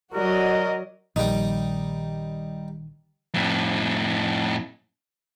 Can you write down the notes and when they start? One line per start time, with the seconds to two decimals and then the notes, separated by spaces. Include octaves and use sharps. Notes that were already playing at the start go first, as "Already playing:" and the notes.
0.14 F#3 F#4 A#4 D5 D#5
1.16 A#1 D#3 G3 D#4
3.34 F2 A2